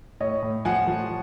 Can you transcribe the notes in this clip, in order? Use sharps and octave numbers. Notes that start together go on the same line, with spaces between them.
A2 C#5 D#5
A2
F3 F#5 G#5
F3